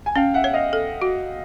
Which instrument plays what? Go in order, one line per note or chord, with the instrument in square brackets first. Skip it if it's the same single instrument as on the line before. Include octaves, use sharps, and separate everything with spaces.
[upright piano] G#5
[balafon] C#4 [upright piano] F5 G5
[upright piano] E5 F#5
[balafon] C#5
[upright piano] D#5 F5
[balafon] A4
F#4